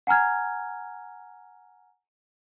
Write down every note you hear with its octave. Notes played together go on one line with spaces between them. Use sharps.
F#5 G#5 A#5 F6 G#6